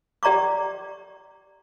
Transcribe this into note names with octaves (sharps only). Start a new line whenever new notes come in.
G4 D5 A#5 C#6 D6